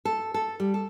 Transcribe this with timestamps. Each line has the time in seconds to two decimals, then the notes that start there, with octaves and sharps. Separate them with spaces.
0.05 A4
0.34 A4
0.60 G3
0.74 A4